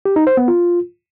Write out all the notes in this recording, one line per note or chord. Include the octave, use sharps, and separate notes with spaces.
G4
D#4
C5
B3
F4